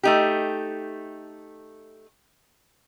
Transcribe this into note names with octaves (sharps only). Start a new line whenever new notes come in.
A3 D#4 G4